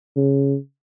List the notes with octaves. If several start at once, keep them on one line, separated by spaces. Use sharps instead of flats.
C#3